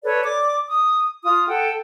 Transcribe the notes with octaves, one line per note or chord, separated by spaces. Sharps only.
A4 B4 C#5 D5
D5 D6
D#6
F4 D#6
A4 F#5 G5